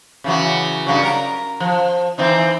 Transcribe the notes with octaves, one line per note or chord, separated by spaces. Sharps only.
C#3 E3 F#3
G2 C#3 F#3
A#4
F3
E3 C4 D#4